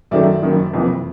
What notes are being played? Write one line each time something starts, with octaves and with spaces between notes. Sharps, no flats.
F#2 D#3 F#3 A3 D5 E5
F#1 F#2 D#3
F#1 F2 C3 E3